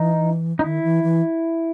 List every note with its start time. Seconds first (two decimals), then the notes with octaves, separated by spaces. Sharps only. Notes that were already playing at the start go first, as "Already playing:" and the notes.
Already playing: E3 D#4
0.59 D#4
0.64 D#3 E4
0.83 E3
1.03 E3